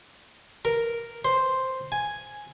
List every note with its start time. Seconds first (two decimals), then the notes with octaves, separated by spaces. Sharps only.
0.65 A#4
1.25 C5
1.92 G#5